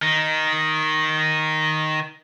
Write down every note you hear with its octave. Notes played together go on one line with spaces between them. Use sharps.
D#3 D#4